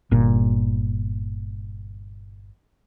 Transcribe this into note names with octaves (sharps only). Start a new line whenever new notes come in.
G1 A#2